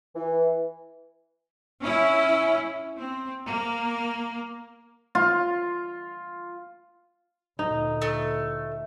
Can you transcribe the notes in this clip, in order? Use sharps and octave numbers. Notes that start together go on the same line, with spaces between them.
E3
C#4 E4
C4
A#3
F4
D2 A#2 D#4
A3